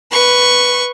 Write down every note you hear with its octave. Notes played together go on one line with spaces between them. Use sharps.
B4 C#6